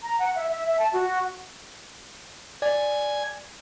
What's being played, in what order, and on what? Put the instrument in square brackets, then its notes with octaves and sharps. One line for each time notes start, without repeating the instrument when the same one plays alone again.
[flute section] A#5
F#5
E5
E5
E5
A5
F#4
[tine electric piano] D5 [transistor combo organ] G#5